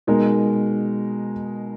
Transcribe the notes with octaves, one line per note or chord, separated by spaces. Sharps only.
B2 G#3 D#4 A#4